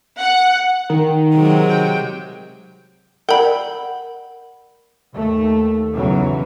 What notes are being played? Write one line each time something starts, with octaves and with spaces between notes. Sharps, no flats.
F#5
D#3
C3 F#3 G#3
G5
A#4 D5 F#5 G5 B5
D#2 A3
B1 E2 C#3 E3 F#3